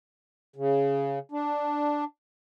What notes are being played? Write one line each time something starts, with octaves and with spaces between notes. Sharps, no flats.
C#3
D4